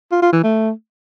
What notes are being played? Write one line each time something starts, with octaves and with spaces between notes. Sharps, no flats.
F4
F4
E3
A3